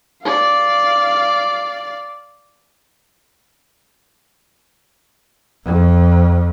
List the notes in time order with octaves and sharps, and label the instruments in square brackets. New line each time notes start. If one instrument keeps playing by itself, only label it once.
[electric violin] D5 F5
[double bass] F2